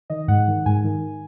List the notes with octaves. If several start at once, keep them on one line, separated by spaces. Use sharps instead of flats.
D#3 D#5
G#2 F#5
D#3
G#2 G#5
D#3